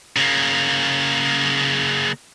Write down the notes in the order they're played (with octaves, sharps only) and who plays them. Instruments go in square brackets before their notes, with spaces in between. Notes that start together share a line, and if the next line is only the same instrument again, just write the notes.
[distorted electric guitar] C#3 A#3